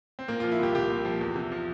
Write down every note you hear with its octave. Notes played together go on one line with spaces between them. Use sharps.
C4
A#2 A#3
F3 F4
E4
C2 G4
C2 G4
A#2
F3
E2
C3
F3